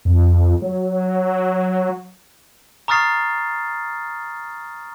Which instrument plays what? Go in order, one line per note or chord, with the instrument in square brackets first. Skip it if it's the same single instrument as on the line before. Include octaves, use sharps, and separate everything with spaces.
[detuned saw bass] F2
F#3
[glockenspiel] A#5 C#6 D#6 F6 A6 C7